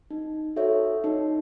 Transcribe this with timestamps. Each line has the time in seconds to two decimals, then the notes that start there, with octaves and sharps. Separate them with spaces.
0.11 D#4
0.56 F#4 A4 C#5 E5
1.04 D#4